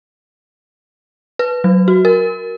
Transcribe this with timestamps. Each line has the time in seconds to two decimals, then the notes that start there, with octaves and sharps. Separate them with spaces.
1.39 B4
1.64 F#3
1.88 F#4
2.05 A#4